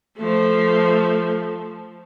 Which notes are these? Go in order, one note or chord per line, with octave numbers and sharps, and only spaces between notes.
F3 A3